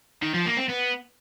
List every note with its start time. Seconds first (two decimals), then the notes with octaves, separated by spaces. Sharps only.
0.22 D#3
0.34 F3
0.45 A#3
0.57 C4
0.68 B3